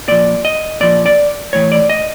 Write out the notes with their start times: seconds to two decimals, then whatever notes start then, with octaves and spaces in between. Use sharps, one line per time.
0.08 A#2 F3 D5
0.45 D#5
0.80 A#2 F3 D5
1.06 D5
1.53 A2 E3 C#5
1.72 D5
1.90 D#5